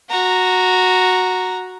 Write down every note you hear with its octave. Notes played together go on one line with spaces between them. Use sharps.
F#4 A#5